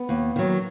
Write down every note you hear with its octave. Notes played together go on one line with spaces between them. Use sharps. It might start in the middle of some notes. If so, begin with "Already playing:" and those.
Already playing: B3
D#2
D#3 F#3